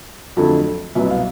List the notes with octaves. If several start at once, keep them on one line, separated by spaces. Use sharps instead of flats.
F2 D3 F#3 A3
C2 B2 F#3 B3 E5
F5